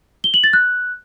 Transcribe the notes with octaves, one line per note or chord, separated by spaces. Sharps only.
G7
F#7
A6
F#6